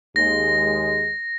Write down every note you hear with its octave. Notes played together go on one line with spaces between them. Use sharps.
D#2 G#3 A#6